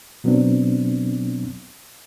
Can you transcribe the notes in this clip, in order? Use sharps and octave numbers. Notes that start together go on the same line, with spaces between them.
B2 F#3 B3 C4 D4